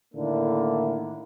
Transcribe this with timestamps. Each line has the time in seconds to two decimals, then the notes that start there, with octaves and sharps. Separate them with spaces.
0.15 A2 D3 D#3 A#3 D4 E4